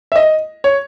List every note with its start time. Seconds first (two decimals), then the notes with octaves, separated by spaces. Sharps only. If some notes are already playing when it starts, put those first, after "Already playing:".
0.12 E5
0.16 D#5
0.64 C#5